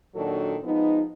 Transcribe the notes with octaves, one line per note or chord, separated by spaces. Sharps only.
A#2 D#3 F#3 D4 F#4 A4
F3 G#3 B3 D#4